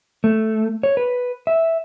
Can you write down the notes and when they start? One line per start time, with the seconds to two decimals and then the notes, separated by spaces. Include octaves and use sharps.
0.24 A3
0.83 C#5
0.97 B4
1.47 E5